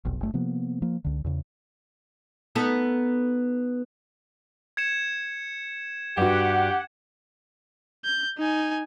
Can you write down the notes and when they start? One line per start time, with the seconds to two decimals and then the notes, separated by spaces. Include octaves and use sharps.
0.05 F1 B1
0.21 F#1 A3
0.34 C3 F3 A#3 B3
0.82 F3 A#3
1.04 C#2 D3
1.24 E2 C#3
2.55 B3 D#4 A4
4.77 G#6 C#7 E7
6.17 G2 F#4 G4 F#5
8.05 G6
8.38 D#4 G#5